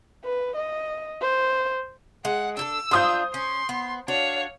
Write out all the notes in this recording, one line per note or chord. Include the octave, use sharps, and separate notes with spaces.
B4
D#5
C5
G#3 F#5
D4 G4 A4 E6
D4 F4 C5 D#6 G6
C#4 C6
B3
D4 F#4 C#5 F5